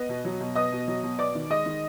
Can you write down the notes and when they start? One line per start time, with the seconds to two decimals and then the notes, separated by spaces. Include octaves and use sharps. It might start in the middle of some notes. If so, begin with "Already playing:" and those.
Already playing: B3 D#5
0.09 B2
0.25 F#3
0.40 B2
0.55 B3 D#5 D#6
0.72 B2
0.88 F#3
1.03 B2
1.18 B3 D5 D6
1.35 D#3
1.50 G#3 D#5 D#6
1.66 D#3